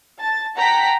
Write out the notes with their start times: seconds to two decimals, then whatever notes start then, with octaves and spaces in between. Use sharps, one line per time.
0.20 A5 A6
0.57 F#5 G5 A5 A#5 B6